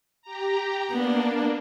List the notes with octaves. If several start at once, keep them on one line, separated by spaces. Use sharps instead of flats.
G4 A#5
A#3 B3 D4